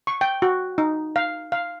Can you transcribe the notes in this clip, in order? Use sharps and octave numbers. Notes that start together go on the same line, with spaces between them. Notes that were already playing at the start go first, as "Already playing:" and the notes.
C#6
G5
F#4
D#4
F5
F5